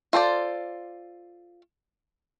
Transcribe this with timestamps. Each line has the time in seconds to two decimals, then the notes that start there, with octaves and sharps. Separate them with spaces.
0.13 F4 A4 C5 D5